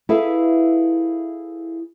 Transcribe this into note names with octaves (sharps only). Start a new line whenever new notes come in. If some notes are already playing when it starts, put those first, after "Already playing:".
E4 G#4 A4 B4 E5 F5